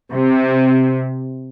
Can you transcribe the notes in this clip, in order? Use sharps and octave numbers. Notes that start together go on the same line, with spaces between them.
C3